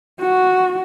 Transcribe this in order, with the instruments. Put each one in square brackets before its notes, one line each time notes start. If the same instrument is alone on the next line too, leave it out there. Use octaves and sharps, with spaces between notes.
[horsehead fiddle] F#4